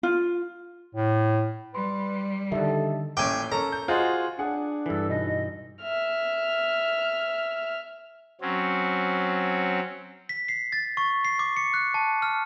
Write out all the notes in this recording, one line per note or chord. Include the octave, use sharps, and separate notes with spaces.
F4
A2
G3 B4 C6
D3 D#3 G4 A4 D#5 E5
A1 A#2 C#4 G5 G#5 D6
C#4 A4 A#4 A#5
G6
F4 F#4 G#4 C5 D#5
D4 G#4 F#5
G2 E3 A4
B2 D#4 D#5
E5 F6
F#3 C4 C#4
B6
C7
A6
C#6
C7
D6
C#7
F#6
A5
F6